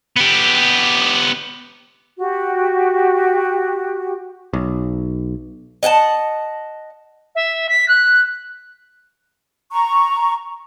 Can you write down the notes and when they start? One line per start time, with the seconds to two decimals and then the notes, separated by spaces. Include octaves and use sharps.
0.16 B3 G4
2.18 F#4 G4
4.53 B1
5.83 D#5 F#5 G5 A5
7.35 E5
7.69 B6
7.88 F#6
9.72 A#5 C#6